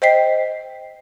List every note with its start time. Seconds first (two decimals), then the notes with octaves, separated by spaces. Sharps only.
0.02 C5 D#5 G5 B6 C7